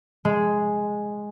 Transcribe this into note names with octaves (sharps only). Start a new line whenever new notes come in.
G#3